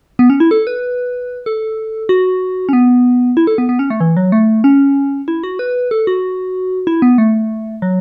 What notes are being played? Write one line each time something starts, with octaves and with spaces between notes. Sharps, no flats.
B3
C#4
E4
A4
B4
A4
F#4
C#4
B3
E4
A4
B3
B3
C#4
A3
E3
F#3
A3
C#4
E4
F#4
B4
A4
F#4
E4
B3
A3
F#3